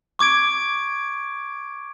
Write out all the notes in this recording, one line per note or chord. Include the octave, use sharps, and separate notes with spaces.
C#6 D6 G#6 D7